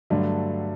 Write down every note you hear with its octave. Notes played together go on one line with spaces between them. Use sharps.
G2 D3 F#3 A3